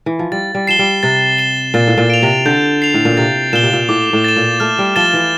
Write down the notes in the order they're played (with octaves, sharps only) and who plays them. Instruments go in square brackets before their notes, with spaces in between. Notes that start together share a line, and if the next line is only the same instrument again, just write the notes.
[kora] E3
F3
[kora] G3 [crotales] A6
[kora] G3
[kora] F3 [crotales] C7 E7 G7
[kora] G3
[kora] C3 [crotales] A6
[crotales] E7 G7
[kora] A#2 [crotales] A6
[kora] A2
A#2
[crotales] D7 F7
[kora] C3
[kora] D3 [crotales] G6
[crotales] C7 F7
[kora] A2
A#2
[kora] C3 [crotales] A6
[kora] A#2 [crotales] E7 G7
[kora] C3
A#2
[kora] A2 [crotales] D6
[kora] A2
[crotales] A6 E7
[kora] A#2
[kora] A3 [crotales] F6
[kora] G3
[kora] F3 [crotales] A6 E7 G7
[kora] E3